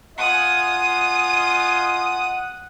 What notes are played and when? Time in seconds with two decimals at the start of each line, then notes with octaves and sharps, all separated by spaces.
0.18 F4 D#5 F#5 G#5 D#6